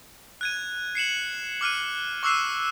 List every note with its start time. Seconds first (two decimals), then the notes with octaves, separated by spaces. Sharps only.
0.41 F#6 G#6 D#7
0.95 C7 C#7 E7 F#7
1.61 D6 F6 F#6 D#7
2.23 C#6 D6 E6 F#6 C7 E7